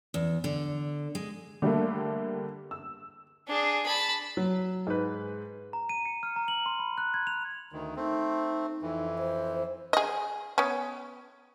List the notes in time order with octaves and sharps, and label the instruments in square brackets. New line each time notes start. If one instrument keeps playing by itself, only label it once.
[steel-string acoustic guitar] E2
D3
G#3
[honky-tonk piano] D3 G3 A3 A#3
E6
[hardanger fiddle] D4 G#4
A5 B5
[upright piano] F#3
G#2 B4
[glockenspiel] A#5
D#7
C#7
F6
A#5
F#7
C6
B5
F#6
G#6
F7
[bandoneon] D2 D#3
[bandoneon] A3 C4 [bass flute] D#4
[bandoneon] F2 E3
[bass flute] C5
[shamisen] G#4 D#5
B3 C#4